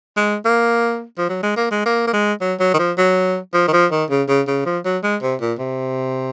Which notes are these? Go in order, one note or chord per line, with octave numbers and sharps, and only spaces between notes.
G#3
A#3
F3
F#3
G#3
A#3
G#3
A#3
A#3
G#3
F#3
F#3
D#3
F3
F#3
F3
D#3
F3
D#3
C#3
C#3
C#3
F3
F#3
G#3
C3
A#2
C3